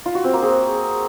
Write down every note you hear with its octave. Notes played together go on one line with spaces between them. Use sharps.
F4
F#4
C4
A#3
G#4